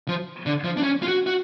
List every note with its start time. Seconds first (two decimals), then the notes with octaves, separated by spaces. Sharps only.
0.08 F3
0.46 D3
0.64 F3
0.77 D4
0.83 C#4
1.02 F4
1.08 F#4
1.27 F#4